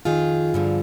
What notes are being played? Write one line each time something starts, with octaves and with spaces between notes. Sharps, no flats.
F2 D#3 F4 G#4
G2 D3 F3